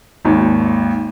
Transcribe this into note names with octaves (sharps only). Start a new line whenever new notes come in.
G#1 D#2